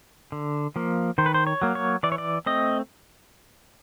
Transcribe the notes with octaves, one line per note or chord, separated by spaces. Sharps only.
D3
F3 A#3
D#3 C5
B4
C5
C#5
F#3 A#3
C#5
E3 D5
C#5
D5
A3 C4 D#5